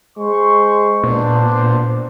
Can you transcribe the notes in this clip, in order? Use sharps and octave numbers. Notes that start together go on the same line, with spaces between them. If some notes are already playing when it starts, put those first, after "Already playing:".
G#3 C5 C6 C#6
A#2 B3 D4 C5